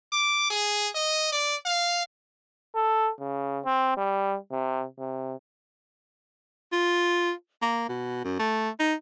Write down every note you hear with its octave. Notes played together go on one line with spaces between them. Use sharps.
D6
G#4
D#5
D5
F5
A4
C#3
C4
G3
C3
C3
F4
A#3
B2
F#2
A3
D#4